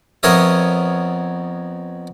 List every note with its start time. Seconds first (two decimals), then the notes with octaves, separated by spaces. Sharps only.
0.23 F2 B3 A#4 C#5 D#5 E5